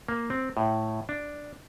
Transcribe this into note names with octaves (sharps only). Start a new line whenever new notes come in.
A#3
C4
A2
D4